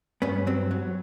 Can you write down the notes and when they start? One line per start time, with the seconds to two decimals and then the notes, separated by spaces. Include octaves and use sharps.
0.22 G2 B3 C#4
0.47 F#3 C4
0.71 F#3